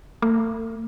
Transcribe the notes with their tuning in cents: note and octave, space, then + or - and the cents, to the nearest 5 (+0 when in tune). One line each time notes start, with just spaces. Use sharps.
A3 +45